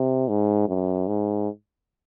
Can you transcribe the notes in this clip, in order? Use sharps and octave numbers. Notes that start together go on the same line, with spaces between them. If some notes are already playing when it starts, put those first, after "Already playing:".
Already playing: C3
G#2
F#2
G#2